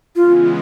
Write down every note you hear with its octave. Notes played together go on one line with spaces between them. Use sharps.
C#3 E3 G#3 B3 F4